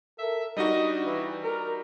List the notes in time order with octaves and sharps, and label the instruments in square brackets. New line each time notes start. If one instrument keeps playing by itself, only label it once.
[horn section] A4 A#4 E5
[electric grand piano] G3 D#4 F#4 [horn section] D4 D#5
[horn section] E3
A#4